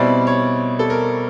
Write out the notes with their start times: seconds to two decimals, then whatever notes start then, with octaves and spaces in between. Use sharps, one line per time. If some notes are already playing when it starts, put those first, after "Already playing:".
Already playing: B2 G3 C4 E4 D5
0.27 C#5
0.79 A4
0.90 A#4